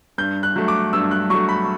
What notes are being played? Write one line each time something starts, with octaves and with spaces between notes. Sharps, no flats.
G2 G6
F#6
F#3 A3
D6
G2 E6
F#6
F#3 A3 C#6
B5